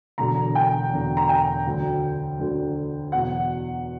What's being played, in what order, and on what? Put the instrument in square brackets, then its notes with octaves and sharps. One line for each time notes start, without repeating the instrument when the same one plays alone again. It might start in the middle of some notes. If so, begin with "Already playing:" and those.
[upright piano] E1 E2 D3 F#3 A#5
G5
E1 E2 D3 F#3
A#5
G5
D2 D3 F#3
D2 D3 F#3
E2 B2 F#3 F#5